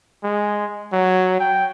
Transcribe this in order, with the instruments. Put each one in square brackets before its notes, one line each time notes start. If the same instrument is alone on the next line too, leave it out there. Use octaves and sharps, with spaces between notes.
[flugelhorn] G#3
F#3
G5